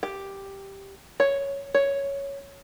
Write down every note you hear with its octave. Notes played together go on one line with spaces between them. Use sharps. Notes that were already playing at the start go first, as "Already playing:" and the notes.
G4
C#5
C#5